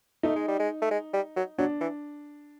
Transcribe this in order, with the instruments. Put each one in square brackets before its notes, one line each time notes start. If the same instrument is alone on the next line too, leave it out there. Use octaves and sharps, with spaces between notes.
[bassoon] A3 [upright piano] D#4
[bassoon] G#3
G3
G#3
A3
G#3
G3
F#3
[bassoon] F#3 [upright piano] D4
[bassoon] E3